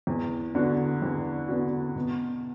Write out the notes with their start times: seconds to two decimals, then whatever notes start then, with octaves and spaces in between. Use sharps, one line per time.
0.07 E2
0.55 D3 B3 F#4
1.02 E2
1.48 D3 B3 F#4
1.96 B2